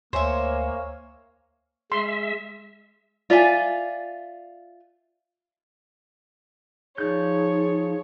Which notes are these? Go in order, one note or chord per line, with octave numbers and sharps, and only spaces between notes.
D2 A#3 C5 C#5 E5 G#5
G#3 E5 C6
F4 D5 E5 G#5
F3 D#4 G#4 C#5 D5 G6